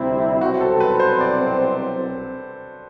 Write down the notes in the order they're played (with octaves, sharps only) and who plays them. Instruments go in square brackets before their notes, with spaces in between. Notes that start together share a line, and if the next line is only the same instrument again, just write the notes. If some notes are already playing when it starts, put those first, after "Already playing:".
Already playing: [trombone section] D2 C3 G3 C4 E4
[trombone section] C2 B2 F#3 C4 [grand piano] F#4
[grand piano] A4
B4
C5
D5